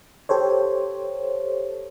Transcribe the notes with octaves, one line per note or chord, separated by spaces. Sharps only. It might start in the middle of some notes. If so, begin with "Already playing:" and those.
G4 A4 C5 C#5